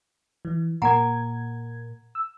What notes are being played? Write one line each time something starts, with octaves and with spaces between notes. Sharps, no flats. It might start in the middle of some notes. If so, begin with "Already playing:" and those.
E3
A#2 A#3 F#5 G#5 A#5 G#6
E6